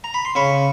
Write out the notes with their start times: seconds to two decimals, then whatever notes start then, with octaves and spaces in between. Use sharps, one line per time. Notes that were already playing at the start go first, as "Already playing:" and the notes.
0.04 A#5
0.14 B5
0.25 C6
0.35 C#3 B5 C#6